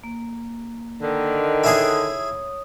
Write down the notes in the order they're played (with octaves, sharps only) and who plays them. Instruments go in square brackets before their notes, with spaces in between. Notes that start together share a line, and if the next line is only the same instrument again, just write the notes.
[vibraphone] A#3
[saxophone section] D3 D#3
[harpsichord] E4 G#4 [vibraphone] C#5 D#6